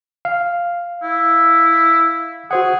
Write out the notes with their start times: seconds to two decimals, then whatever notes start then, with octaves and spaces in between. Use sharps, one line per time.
0.25 F5
1.03 E4
2.51 F#4 G#4 C5 F#5